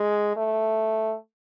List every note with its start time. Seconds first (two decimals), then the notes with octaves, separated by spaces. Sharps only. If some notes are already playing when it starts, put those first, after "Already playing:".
Already playing: G#3
0.36 A3